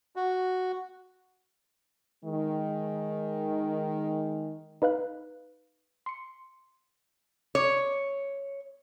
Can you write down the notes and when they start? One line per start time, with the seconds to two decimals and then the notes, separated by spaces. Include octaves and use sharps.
0.16 F#4
2.24 D#3 G#3
4.82 D#4 B4 F5 F#6
6.06 C6 C#7
7.55 C#5